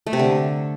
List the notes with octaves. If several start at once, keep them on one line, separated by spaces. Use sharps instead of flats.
A3
C3
D3